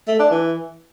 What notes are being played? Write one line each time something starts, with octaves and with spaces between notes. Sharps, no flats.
A3
D4
E3